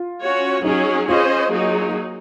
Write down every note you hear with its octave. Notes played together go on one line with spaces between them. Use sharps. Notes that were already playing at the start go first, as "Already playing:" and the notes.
Already playing: F4
C#4 F#4 C#5
F#3 C#4 D#4 G#4
C#4 F4 G#4 C5 D#5
F#3 A#3 D#4 G#4